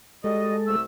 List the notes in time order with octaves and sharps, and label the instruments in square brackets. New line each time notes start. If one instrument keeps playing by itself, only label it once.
[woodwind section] G3 F#4 D#5 [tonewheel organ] G#3 A4
[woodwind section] C2 A3 E6